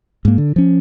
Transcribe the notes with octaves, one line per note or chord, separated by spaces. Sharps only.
G#2 A#3
D3
F3 C#4